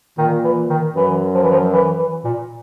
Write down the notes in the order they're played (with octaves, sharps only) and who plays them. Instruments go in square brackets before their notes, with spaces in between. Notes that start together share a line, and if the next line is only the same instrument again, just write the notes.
[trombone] A#2 [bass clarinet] D#3
[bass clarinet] E3
D#3
[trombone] F#2 [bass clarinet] E3
[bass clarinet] F3
E3
F3
E3
E3
A#2